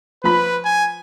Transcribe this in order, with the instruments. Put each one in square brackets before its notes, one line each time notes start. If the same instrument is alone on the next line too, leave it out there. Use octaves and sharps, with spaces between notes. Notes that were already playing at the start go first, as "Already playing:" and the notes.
[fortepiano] F3 B5 [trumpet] B4
[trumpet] G#5